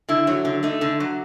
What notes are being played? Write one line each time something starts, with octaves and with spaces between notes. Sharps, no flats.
D3 E4
F#3
D3
A3 D#4
D3
F#3